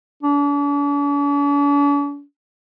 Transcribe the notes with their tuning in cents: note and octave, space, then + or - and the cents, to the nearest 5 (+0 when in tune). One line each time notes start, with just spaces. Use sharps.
D4 -45